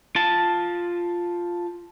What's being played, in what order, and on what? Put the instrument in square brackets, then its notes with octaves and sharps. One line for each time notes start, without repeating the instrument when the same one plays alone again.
[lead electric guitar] F4 A5